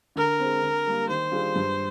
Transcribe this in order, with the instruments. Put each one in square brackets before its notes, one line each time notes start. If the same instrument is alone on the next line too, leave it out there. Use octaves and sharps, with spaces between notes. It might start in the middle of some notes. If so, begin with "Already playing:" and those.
[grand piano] D3 [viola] A#4
[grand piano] G#3 C4
D3
G3 A#3
[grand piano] D#3 [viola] C5
[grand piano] G3 D4 F4 G#4
G2